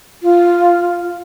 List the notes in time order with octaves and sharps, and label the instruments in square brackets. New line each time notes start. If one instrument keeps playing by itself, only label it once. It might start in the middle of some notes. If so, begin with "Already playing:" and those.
[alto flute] F4